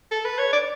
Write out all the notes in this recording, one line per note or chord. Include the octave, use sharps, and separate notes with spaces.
A4
B4
C#5
D5